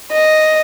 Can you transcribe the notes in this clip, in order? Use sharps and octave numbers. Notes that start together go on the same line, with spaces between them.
D#5